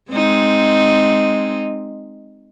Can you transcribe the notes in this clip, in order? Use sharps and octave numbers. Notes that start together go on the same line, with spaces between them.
G#3 C4 D#4